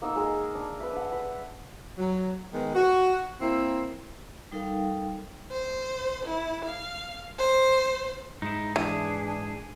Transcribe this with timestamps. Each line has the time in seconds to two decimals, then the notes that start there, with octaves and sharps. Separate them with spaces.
0.02 A#3 D#4 F#5 E6
0.16 G#3 G#4 A#4
0.55 D4
0.80 B4 E5
0.93 D4 F#5
1.12 B4
1.98 F#3
2.52 D#3 G#3 B3
2.75 F#4
3.41 A#3 C4 E4
4.51 G3 D#4 A4 A#4 F5 G5
5.50 C5
6.25 E4
6.64 F5
7.38 C5
8.42 G#2 G#3 D#4 E4
8.76 E3 D4 G#4